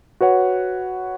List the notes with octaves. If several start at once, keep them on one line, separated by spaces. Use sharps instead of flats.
F#4 B4 C#5 F#5